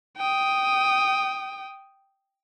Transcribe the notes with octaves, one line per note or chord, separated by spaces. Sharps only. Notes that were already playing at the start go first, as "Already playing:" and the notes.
G5 D#6